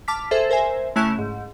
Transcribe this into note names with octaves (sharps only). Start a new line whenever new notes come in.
A5 D6 F6 B6
G#4 A4 C5 E5
A#4 C5 E5 G#5
C#3 A3 C#4 E4 F#6 E7
G#2